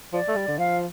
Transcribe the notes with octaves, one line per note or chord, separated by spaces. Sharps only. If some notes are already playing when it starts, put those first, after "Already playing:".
F3 D5
A3
G3
D3
F3 F5